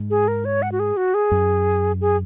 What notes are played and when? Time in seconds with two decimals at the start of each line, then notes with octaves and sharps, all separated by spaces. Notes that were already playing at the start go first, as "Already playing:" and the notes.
Already playing: G#2
0.10 G#4
0.28 A#4
0.45 C#5
0.62 F#5
0.72 F#4
0.80 G#4
0.97 F#4
1.14 G#4
1.31 F#2
2.01 G#4